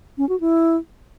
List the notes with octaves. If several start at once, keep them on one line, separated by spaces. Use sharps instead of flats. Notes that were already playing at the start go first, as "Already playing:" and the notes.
C#4
F#4
E4